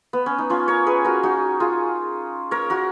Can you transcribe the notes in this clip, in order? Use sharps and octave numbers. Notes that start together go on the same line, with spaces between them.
B3
C#4
D#4
C#4 F4
A#4 C#5
G#4 B4
F#4 A#4
D#4 F#4
F4 G#4
A#4 C#5
F#4 A#4